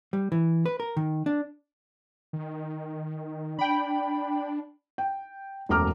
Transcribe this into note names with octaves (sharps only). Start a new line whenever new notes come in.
G3
E3
B4
A#4
D#3
D4
D#3
D4 G5 B5
G5
E1 F#2 A3 A#5 D6 F6